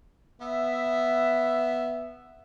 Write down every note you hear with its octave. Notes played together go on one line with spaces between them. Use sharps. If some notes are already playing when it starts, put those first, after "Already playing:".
B3 E5